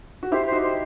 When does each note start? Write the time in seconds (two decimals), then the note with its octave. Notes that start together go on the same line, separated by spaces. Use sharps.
0.23 F#4
0.31 E4 G4 C5
0.47 C5
0.52 D#4 F#4
0.62 C5